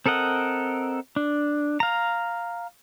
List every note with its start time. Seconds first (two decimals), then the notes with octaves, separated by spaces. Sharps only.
0.06 C4 A4 A#4 D#5 F#5
1.16 D4
1.80 F5 A#5